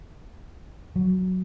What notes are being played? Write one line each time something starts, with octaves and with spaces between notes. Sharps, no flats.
F#3